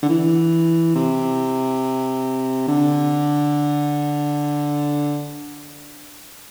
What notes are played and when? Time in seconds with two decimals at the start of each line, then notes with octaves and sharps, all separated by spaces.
0.02 D3
0.09 E3
0.95 C3
2.68 D3